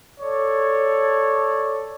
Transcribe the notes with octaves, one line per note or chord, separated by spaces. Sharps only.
A4 C#5 D5